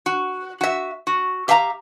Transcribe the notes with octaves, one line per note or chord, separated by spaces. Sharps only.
F#4
F#4 E5
F#4
G4 E5 F5 A5 A#5